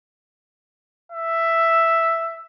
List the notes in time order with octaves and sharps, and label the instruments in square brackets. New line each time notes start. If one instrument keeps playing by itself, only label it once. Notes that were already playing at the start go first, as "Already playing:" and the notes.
[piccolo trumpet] E5